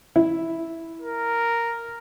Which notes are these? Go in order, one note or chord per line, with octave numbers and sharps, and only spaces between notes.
E4
A#4